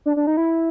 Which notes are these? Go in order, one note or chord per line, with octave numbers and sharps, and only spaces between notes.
D4
D4
D#4
E4